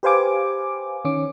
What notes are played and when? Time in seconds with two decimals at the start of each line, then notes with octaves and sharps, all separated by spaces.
0.03 G4 B4 C5 F5 G#5 D6
1.05 D#3 C#4 D6